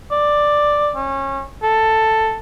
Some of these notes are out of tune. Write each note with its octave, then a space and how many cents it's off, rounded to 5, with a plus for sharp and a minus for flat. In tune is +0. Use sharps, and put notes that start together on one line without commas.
D5 +5
C#4 -25
A4 +5